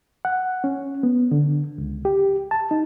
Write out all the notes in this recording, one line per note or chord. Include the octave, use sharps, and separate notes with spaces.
F#5
C#4
B3
D3
C#2
G4
A5
D#4